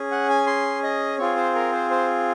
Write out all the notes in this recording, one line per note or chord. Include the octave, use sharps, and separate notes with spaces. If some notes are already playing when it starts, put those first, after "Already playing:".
Already playing: C#4 G#4
F#5
G#5
C6
D#5
C4 F4 G#4 C#5
C5
A#4
C5
C5